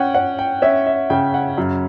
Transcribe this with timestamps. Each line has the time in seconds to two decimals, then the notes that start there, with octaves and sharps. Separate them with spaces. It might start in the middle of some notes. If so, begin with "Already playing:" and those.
Already playing: C#4 C#5 F#5 G5
0.14 C#4 F#5
0.39 G5
0.62 C#4 E5
0.87 E5
1.10 C#3 G5
1.34 F#5
1.57 F#2